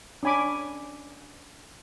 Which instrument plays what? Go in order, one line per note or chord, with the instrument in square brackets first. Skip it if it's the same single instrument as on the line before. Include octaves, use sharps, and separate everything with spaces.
[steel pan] C#4 D4 G#5 B5 D6